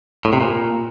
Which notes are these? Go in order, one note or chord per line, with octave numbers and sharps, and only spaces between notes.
A2
C3
A#2